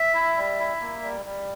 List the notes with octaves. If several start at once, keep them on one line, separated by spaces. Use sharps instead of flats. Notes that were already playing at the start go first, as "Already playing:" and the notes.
Already playing: E5
E4
G3
E4
A#3
G3
G3